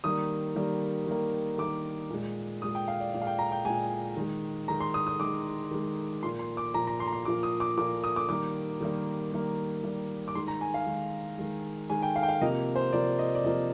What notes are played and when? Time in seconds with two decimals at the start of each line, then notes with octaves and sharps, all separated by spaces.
0.04 D#3 G3 A#3 D#6
0.56 D#3 G3 A#3
1.07 D#3 G3 A#3
1.58 D#3 G3 A#3 D6
2.10 A#2 G#3
2.62 A#2 G#3 D#6
2.75 G5
2.88 F5
3.00 D5
3.13 A#2 G#3 D5
3.22 F5
3.27 G5
3.39 A#5
3.52 G5
3.65 A#2 G#3 G#5
4.16 D#3 G#3
4.68 D#3 G#3 A#5
4.80 C6
4.94 D#6
5.07 D#6
5.20 D#3 G#3 D6
5.71 D#3 G#3
6.23 A#2 F3 A#3 C6
6.39 C6
6.57 D6
6.74 A#2 F3 A#3 A#5
6.87 A#5
7.00 C6
7.07 A#5
7.12 C6
7.25 A#2 F3 A#3 D6
7.43 D#6
7.60 D6
7.77 A#2 F3 A#3 D6
8.04 D#6
8.16 D6
8.29 D#3 G3 A#3 D6
8.81 D#3 G3 A#3
9.32 D#3 G3 A#3
9.84 D#3 G3 A#3
10.28 D6
10.35 D#3 G#3 C6
10.48 A#5
10.61 G#5
10.74 F5
10.86 D#3 G#3
11.38 D#3 G#3
11.90 D#3 G#3 G#5
12.02 G5
12.16 F5
12.23 G5
12.29 F5
12.41 C3 F3 A#3 D#5
12.76 C5
12.93 C3 F3 A#3 D5
13.19 D#5
13.35 D5
13.44 C3 F3 A#3 D#5